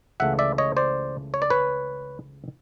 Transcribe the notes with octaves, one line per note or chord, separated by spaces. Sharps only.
C#2 C#3 E3 A3 E5 F#5
D5 E5
C#5 D#5
C5 D5
C#5
D5
B4 C#5